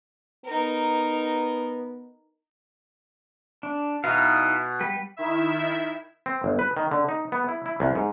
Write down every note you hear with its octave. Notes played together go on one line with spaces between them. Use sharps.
B3 D#4 A#4
D4
B2 D#4 E4 F5
G3 B4
D#3 E4 E5
C4
G1
B4
D#3
D3
D#4
B3
E4
E4
C2
G#2